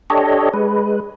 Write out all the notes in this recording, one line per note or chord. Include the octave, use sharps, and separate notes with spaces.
D4 G4 A4 C#5 D#5
G#3 B4